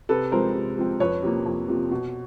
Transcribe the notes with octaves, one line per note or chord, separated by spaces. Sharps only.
C3 A4 B4
F3 G#3 C4 A#4 C5
C3
F3 G#3 C4
F2 B4 C#5
C3 F3 A#3
F2
C3 F3 A#3
B2